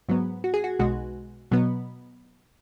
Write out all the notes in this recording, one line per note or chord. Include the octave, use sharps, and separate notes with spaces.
G#2 F#3 B3
F#4
G#4
F#4
B1 B2 G#3 F#4
B2 F#3 B3